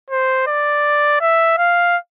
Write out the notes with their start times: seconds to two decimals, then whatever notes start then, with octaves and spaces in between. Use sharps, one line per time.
0.10 C5
0.47 D5
1.21 E5
1.58 F5